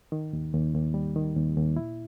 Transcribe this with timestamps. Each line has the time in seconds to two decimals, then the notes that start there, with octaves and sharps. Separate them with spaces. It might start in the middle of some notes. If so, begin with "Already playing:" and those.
0.12 D#3
0.33 D#2
0.53 D#2
0.74 D#2
0.94 G3
1.16 D#3
1.36 D#2
1.57 D#2
1.76 A#2 E4